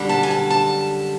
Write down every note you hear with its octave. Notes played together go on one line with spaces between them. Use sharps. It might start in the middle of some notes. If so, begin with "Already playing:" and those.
Already playing: F#2 D3 G3
A5
G#5
A5
A5